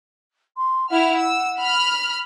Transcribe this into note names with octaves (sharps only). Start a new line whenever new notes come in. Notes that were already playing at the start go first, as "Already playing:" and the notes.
C6
E4 F#5 F6
E6
B5 F6